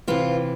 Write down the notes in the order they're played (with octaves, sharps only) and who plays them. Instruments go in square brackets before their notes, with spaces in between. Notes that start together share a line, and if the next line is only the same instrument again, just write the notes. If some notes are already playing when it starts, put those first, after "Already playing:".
[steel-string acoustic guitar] C3 E3 F4